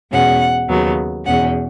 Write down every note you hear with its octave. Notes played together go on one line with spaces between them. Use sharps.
E2 B2 G#3 C#4 F#5
D#2 C#3 F#3 B3
E2 B2 G#3 C#4 F#5